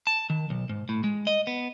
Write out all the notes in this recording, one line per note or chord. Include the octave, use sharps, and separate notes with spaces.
A5
D#3
B1
G#2
A2
G#3
D#5
B3